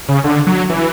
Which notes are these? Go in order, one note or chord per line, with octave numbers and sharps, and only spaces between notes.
C#3
D3
F#3
E3